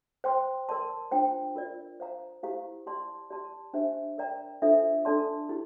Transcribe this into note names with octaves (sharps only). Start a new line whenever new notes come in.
C5 G5 C6
A#4 D5 A5 C6
D4 F4 C5 G5 A#5
F4 A#4 D5
C5 F5 A#5
E4 G4 C5 F5 A#5
G4 D5 A5 C6
G4 D5 A5 C6
D4 G4 C5 E5
A#4 D5 G5 A#5
D4 F4 A4 C5 E5
D4 A4 D5 A5 C6
E4 G4